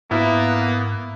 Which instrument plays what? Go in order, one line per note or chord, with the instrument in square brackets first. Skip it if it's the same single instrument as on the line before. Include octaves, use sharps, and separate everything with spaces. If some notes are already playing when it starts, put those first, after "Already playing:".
[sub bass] G#2 [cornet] A#3 [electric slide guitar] B3 [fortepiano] E4